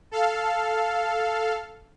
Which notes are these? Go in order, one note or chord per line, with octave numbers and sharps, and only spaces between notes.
A4 F5